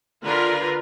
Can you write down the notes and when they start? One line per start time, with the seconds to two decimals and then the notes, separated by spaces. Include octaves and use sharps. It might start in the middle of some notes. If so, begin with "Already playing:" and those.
0.24 D3 F4 A#4 B4